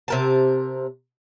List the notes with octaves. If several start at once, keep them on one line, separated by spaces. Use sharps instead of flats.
C3 A#4 A5